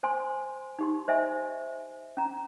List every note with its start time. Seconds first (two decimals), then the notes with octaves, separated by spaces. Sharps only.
0.03 C5 G#5 C6
0.79 D#4 G4 C6
1.08 C5 D#5 E5 G#5
2.17 C#4 A#5